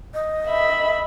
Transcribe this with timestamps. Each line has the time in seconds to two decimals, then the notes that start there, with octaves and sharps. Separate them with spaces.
0.14 D#5
0.47 E5 B5